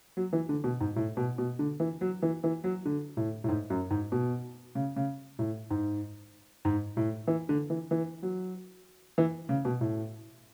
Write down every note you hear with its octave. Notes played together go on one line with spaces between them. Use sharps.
F#3
E3
D3
B2
G#2
A2
B2
B2
D3
E3
F#3
E3
E3
F#3
D3
A2
A2
G#2
F#2
G#2
B2
C#3
C#3
A2
G#2
G#2
A2
E3
D3
E3
E3
F#3
E3
C#3
B2
A2